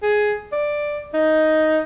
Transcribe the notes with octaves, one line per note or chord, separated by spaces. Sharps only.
G#4
D5
D#4